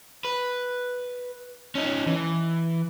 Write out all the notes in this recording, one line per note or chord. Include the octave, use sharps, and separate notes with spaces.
B4
C#4 D#4
E3